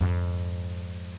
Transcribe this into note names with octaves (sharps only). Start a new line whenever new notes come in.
F2 G#2